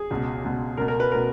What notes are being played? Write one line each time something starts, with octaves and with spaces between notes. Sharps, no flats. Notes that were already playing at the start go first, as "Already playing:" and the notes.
Already playing: G#4
C#2 B2
C#2 B2
C#2 B2 A#4
A#4
B4
B2 A#4